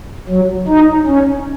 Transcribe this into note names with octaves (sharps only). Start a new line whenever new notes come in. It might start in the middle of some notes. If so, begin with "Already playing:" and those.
F#3
D#4
C#4